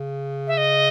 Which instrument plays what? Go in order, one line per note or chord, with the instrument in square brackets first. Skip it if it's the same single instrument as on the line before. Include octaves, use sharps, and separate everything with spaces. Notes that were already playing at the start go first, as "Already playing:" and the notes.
Already playing: [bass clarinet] C#3
[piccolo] E5
D#5